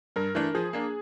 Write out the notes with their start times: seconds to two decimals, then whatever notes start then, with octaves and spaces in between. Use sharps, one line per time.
0.16 G2 A#4
0.35 E3 A3 D4
0.55 F3 G#4
0.73 A#3 D4